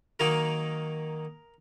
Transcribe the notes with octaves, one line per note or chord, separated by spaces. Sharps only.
D#3 F#3 A#3 D#4 A#4